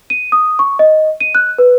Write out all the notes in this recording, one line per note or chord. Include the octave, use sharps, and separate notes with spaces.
D#7
D#6
C#6
D#5
D#7
F#6
B4